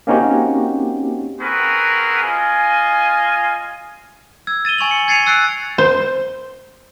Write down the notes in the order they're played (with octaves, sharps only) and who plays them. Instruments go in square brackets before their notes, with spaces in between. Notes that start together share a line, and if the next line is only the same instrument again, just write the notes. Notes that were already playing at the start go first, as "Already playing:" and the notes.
[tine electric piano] A#3 C4 C#4 D#4 F#4 G4
[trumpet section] C4 F#4 G#4 A#4 B4
F4 D#5 G#5
[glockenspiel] E6 G#6
A6 D#7 E7 G7
G#5 C#6 F7 F#7
C#7
G#6 A6 C7 C#7 D#7 F7
E6 F#6 A6 C7 D7
[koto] C5